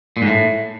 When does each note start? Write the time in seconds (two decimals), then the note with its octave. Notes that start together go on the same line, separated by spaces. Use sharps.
0.17 A#2
0.22 G#2
0.27 A2